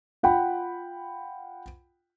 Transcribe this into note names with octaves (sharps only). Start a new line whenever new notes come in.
F4 F#5 G5 B5